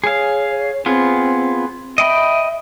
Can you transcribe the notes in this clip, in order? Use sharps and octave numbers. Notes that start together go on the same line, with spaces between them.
G#4 C#5 F5
B3 C4 F4 G#4
D#5 E5 G5 B5